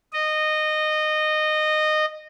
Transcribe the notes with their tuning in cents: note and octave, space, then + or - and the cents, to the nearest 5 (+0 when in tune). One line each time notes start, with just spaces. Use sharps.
D#5 -20